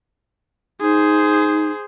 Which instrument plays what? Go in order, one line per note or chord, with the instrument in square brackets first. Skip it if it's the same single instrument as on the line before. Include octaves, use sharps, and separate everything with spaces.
[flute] D#4 [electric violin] G#4 C5